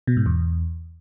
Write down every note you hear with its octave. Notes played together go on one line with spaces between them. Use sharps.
B2
G#2
E2